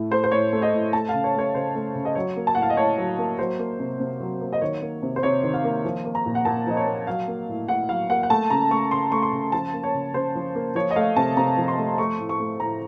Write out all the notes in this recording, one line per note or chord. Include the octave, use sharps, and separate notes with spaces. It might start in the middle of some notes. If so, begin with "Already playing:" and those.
Already playing: A2 A3
A3 C5
C5
A2 C#5
A3
D#5
A2
A3 A5
C#3 F5
C#5
A3 C#5
C#3 C5
A3
C#3
D#5
F#3 C#5
A#3
A5
A2 F#5
F5
D#5
A2 C#5
F#3
A#3
F#3 C5
A#3
C3
C3
F#3
A#3
D#5
D#3 C#5
A#3
C3
C5
C3 C#5
D#3
F5
A#3
F3
A#3
A#5
A#2
F#5
A#2 A5
F3 D#5
C#5
A#3
F#3 F5
A#3
A2
A2 F#5
F#3 F5
A#3 F#5
F#5
A3 A5
C#3 A#5
A3 C#6
C#3 C6
A3 C#6
C6
C#3
F3 A5
A#3
C#5
C#3
C#3 C5
F3
A#3
F3 C#5
D#5
A3 F5
C3 A5
C3 A#5
F3
C6
A3
A3 C#6
A2
C#6
A3
A2 A#5